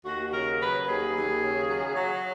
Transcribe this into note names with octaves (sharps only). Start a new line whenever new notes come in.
D#2 F#4
C#3 A#4
F#3 B4
D#2 G#4
D#2
C#3
F#3
F#3